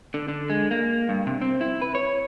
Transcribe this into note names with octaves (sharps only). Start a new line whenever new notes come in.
D3
D3
G#3
A#3
G2
C3
C4
E4
B4
C#5